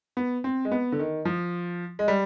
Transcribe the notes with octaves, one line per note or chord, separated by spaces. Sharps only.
B3
C4
G#3
B3
D3
D#3
F3
G#3
G3